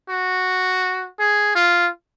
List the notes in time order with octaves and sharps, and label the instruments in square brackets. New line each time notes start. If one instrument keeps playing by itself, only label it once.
[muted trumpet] F#4
G#4
F4